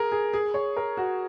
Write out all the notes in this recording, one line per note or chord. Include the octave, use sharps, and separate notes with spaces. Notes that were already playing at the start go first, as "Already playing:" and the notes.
Already playing: G#4 A#4
G#4
G#4
C#5
A#4
F#4